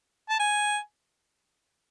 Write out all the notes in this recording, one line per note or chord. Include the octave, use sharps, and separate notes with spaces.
A5
G#5